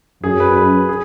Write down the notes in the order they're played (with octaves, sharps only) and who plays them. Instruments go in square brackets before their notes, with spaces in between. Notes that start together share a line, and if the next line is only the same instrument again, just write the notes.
[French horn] F#2 [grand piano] G#4
[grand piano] B4
B4
G#4